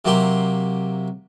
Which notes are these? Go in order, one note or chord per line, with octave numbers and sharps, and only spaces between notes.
C3 F#3 A#3 G4 C6